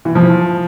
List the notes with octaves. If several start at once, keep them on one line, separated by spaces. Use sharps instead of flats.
E3
F3